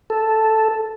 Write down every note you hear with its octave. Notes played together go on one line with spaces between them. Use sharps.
A4